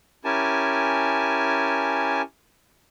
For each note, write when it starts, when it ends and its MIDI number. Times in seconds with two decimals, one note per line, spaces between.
0.25 2.22 61
0.25 2.22 64
0.25 2.22 67
0.25 2.22 70
0.25 2.22 80
0.25 2.22 81